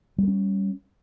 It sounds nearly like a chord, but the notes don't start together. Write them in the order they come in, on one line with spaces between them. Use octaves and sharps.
G3 A3 C#4